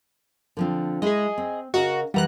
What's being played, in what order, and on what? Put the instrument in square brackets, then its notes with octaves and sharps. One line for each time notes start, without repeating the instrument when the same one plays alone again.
[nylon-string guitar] D3 F3 C4
[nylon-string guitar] G#3 E4 [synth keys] G#4 D#5
[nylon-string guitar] C4
[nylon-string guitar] C#3 A#4 D#5 [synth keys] F#4
[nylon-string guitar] E3 F#5 [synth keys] G3 A#5 F#6